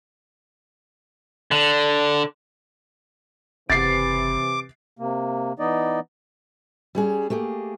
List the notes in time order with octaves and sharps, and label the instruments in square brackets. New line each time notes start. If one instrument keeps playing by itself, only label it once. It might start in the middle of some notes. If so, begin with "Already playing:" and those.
[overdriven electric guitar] D3
[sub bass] F#1 [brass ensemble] C3 E3 [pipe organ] D6 [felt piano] A6 C7
[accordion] C3 A#3
E3 B3 D#4 D5 D#5
[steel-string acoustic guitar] G3 C#4 G#4
A3 A#3 G4 G#4